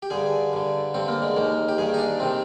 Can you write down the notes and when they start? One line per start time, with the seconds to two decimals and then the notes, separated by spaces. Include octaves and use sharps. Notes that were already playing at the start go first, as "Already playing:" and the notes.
0.02 G4
0.10 G2 D3 G#4
0.53 G2 D3
0.94 G2 D3 C4
1.08 A#3
1.22 G#3
1.36 D#2 D#3 A#3
1.68 G4
1.78 G2 D#3 G#4
1.94 D#4
1.99 D4
2.20 C3 D#3 C4